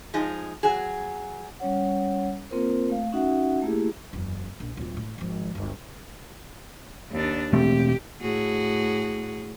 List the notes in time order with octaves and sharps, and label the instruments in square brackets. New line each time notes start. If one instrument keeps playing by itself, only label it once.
[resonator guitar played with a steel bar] F3 G#3 D#4
F#3 G#4
[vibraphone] G3 C#4 C#5 F#5
A#3 C4 F4 A#4 C5
A3 F5
C#4 D#4 F#4 E5 F#5
A3 A#3 E4 G4 G#4
[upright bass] F#1 E2
A#1
D1 F4
A2
G#1 F3
G1 D2
[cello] D#2 D4
[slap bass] E1 A3 C4 [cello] G4
[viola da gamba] A2 F#4 G#4